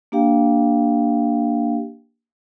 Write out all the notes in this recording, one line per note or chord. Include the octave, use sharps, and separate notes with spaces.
A#3 D4 G4 F5 G5